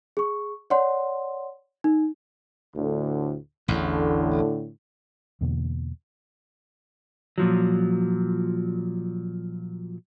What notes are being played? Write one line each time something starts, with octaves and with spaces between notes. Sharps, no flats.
G#4 C#6
C#5 D5 F#5 C6
D#4
D2 A2 D3
A1 E2 A2 D3
E2 B2 D3 A#3
A#2 F3 F#3